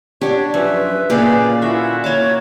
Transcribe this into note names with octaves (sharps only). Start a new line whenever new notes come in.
D4 G4 C#5 F#5
F#2 F3 B4 E5
A#2 C#3 G4 G#4 B4 D5 F5
E4 F#4 A4 E5
A#3 C#5 A5 D6